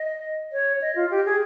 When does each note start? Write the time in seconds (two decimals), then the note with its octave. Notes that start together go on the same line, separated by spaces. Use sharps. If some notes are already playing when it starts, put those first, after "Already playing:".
Already playing: D#5
0.52 C#5
0.81 D#5
0.96 F4
1.11 G4
1.26 G#4